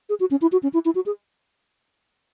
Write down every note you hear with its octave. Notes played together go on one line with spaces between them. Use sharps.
G#4
F#4
C#4
E4
F#4
C#4
E4
E4
F#4
G#4